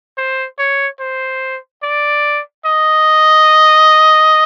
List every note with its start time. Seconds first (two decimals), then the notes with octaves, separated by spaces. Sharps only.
0.18 C5
0.59 C#5
1.00 C5
1.83 D5
2.65 D#5